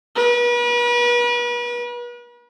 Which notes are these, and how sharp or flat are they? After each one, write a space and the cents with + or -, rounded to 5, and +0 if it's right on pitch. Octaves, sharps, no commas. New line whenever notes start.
B4 -40